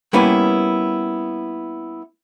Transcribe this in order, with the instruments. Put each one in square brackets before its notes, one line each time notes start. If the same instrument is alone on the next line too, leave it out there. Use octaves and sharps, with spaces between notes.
[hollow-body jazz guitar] G3 A#3 B3 C#4 E4 B4